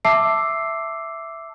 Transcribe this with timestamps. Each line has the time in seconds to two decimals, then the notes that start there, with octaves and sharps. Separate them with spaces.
0.05 E5 A5 D6 E6 C7